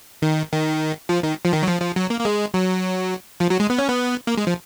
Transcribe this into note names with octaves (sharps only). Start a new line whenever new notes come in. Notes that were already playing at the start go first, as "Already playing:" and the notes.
D#3
D#3
F3
D#3
F3
D#3
F#3
F3
F3
F#3
A#3
A#3
G#3
F#3
F3
F#3
G#3
B3
C#4
B3
A#3
G#3
F3